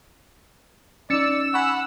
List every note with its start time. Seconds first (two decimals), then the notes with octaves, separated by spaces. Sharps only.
1.10 C#4 D#4 D5 E6 A6 C#7
1.54 F#5 G#5 B5 C#6